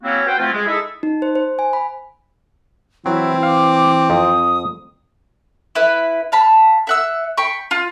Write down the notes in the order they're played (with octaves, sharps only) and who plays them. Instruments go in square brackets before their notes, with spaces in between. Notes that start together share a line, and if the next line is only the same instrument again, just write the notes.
[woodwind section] F#3 A#3 C4 C#4 E4 F#4
F#4 B4 C5 G5
F3 A3 C4 E4 F4
G#3
D#4 E4 G#4 A4 E5
[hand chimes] D#4
C5
C5
G#5
B5
[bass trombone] E3 [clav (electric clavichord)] F#3 [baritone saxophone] C4 [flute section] E4
[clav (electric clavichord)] F5 [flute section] D6
[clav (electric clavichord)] F2 [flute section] D#6
[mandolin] E4 B4
F5 A5 B5
E5 F#5 E6
G5 B5 C#6
F4